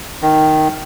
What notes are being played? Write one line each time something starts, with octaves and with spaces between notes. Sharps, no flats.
D#3